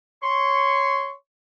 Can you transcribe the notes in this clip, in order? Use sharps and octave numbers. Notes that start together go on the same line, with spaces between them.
C#5 C6 C#6